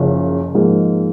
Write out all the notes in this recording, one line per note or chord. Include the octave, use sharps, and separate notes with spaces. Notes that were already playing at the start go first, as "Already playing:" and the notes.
Already playing: F#1 F#2 C#3 F3
G#2 F3 A#3